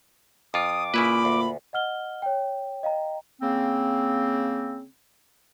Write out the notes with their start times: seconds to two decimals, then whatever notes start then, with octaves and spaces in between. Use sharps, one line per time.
0.54 F2 F4 D6 D#6
0.94 A#2 C#3 E4 B4 B5
1.25 D2
1.73 D#5 F#5 F6 G7
2.22 C#5 G5
2.83 D#5 F5 G5 A#5
3.41 C#3 A#3 C4